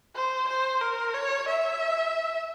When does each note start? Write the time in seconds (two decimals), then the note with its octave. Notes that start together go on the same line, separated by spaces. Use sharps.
0.15 C5
0.48 C5
0.81 A#4
1.14 C#5
1.48 E5